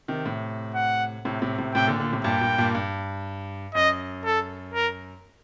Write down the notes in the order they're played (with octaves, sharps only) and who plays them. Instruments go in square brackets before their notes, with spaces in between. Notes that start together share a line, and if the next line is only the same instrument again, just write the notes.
[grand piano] C3 D#3
A2 C3
[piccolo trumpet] F#5
[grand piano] A2 C3
A2 C3
A2 C3
[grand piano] A2 C3 [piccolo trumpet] G5
[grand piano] A#2 D3
A#2 D3
A2 C3
[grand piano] G2 A#2 [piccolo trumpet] G5
[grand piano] G2 A#2
G2 A#2
G2
[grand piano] F#2 [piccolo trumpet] D#5
[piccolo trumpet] A4
A#4